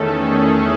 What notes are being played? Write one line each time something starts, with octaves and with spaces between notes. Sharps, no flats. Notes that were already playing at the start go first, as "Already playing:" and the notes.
Already playing: E2 D#3 A3 C#4 A4
G#4